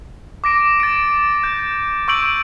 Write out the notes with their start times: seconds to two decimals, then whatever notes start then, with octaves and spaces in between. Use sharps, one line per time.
0.44 D6 A#6 D7
0.80 A6 D7
1.44 G6
2.08 C#6 E6 G6 D7 F#7